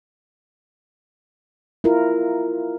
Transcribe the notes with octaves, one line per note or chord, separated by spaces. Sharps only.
E4 F4 A#4